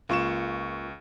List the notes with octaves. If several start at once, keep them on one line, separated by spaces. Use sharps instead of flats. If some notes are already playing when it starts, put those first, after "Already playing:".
C#2 A#3 F4 C#6 E7